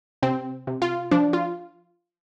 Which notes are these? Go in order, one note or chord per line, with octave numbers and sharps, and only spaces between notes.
C3 C4
C3
F4
F3 D4
F4